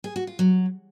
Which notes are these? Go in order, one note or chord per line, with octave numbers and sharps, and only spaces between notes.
G#4
F#4
F4
F#3